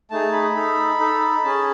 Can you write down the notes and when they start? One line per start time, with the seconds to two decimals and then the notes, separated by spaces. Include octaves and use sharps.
0.10 A3 D#4 G#4 A5
0.33 B5
0.56 D#4 A4
1.00 D#4 A4
1.44 C#4 G#4 A5